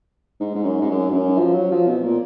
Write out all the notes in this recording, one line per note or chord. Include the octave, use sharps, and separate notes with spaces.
G#2
G#2
F#2
G#2
F#2
G#2
F#2
F3
F#3
F3
B2
A#2